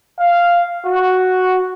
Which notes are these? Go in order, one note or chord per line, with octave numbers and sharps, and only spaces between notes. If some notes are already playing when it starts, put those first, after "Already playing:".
F5
F#4